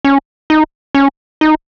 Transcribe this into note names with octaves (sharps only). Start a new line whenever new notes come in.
C#4
D#4
C#4
D#4